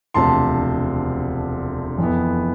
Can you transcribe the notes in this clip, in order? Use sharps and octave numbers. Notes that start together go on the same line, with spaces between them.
E1 D2 C3 F3 A5 C6
F2 E3 B3